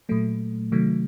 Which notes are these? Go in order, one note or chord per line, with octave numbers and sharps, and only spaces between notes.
A#2 F#3 A3
C3 D#3 F#3 A3